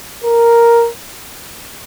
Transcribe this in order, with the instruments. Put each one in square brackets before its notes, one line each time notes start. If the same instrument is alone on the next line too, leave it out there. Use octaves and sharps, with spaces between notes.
[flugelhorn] A#4